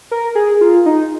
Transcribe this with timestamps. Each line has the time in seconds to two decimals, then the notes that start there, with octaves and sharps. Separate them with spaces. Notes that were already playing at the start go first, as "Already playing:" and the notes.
0.11 A#4
0.35 G#4
0.61 F4
0.86 D#4